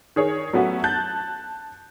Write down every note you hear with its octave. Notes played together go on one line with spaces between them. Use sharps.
D#3 G#4 C#5
F#3 A3 B3 C#4 F#4
A5 F#6 G6 A6